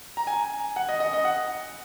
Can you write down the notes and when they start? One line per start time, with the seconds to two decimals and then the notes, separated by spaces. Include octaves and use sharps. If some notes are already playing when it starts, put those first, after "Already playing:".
0.17 A#5
0.27 G#5
0.76 F#5
0.89 D#5
1.00 D#5
1.13 D#5
1.25 F#5